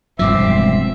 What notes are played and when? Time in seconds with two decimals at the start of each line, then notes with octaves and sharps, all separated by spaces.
0.19 E1 G2 F3 G#3 C4 E5 D6 E6